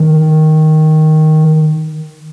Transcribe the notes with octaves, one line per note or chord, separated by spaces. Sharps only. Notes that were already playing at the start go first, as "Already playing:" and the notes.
Already playing: D#3